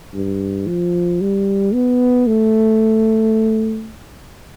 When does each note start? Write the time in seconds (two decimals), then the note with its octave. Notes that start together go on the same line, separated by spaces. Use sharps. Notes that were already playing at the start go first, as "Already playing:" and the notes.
0.14 G2
0.67 F3
1.21 G3
1.74 B3
2.27 A3